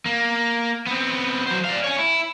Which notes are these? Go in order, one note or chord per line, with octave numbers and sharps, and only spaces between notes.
A#3
B3 C4
F#3 C5
D5 F5
C#5 G#5
E4